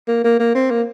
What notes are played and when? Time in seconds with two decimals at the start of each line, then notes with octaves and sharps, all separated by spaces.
0.08 A#3
0.24 A#3
0.40 A#3
0.55 C4
0.71 A#3